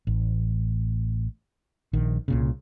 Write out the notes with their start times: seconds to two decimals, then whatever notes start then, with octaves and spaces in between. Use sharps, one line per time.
0.07 A1
1.93 A#1 D#3
2.28 C2 A#2 C#3